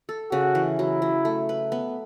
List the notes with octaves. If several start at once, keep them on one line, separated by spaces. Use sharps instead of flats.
A4
C#3 F#4
E3
F#3 E4
F#3
A3
B4
B3